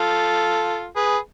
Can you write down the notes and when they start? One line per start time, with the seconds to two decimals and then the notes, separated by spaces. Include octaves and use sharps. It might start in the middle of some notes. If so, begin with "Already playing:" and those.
Already playing: F4 A4
0.96 G#4 B4